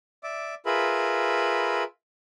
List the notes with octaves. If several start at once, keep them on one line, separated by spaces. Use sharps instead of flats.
D5 E5 D6
F4 G#4 A#4 B4 E5 B5